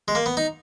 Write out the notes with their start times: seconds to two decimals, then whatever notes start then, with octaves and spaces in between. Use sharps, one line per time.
0.08 G#3
0.15 A#3
0.26 B3
0.37 D#4